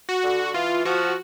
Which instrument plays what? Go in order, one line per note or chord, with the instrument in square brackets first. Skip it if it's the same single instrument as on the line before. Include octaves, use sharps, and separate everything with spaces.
[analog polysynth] F#4
[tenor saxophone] D3
[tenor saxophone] E3 [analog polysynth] F4
[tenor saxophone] F3 [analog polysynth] F#4